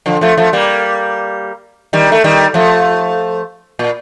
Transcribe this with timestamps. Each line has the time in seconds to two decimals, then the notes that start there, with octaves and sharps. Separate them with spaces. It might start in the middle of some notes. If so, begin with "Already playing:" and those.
0.06 D3 F3
0.21 F3 A3
0.37 F3 A3
0.53 G3 A#3
1.93 D#3 G3
2.12 A3
2.24 D#3 G3
2.54 F3 A3
3.79 A#2